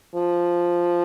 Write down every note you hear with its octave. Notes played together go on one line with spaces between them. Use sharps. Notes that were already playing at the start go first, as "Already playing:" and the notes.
F3